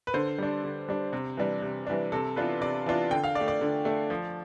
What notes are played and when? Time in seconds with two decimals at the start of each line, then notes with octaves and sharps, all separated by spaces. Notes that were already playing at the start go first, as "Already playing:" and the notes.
0.07 B4
0.14 D3 C5
0.38 G3 D4
0.64 D3
0.88 G3 D4
1.13 C3
1.37 E3 G3 D4
1.62 C3
1.87 E3 G3 D4
2.12 C3 A4
2.36 E3 B3 D4 F4 B4
2.61 C3 D5
2.86 E3 B3 D4 F4
3.11 D3 G5
3.24 F5
3.35 D4 D5
3.40 A3
3.48 D5
3.61 D3
3.85 A3 D4
4.10 F3